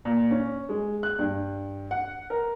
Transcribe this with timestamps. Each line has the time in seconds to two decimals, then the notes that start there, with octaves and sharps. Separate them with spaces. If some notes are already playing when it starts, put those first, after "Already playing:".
0.05 A#2
0.31 C#4
0.69 G#3
1.03 F#6
1.19 G2
1.91 F#5
2.30 A#4